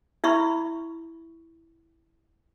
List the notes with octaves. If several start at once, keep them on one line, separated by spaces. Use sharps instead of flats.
E4 E5 B5 C#6